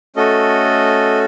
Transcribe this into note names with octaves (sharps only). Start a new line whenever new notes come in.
A3 C#4 F#4 A4 D#5